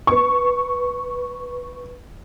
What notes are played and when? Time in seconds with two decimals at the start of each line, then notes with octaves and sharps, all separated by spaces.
0.07 B4 C#6